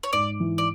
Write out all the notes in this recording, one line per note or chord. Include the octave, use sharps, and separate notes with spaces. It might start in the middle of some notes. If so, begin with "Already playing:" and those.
C#5
G#2 D5
E3
D5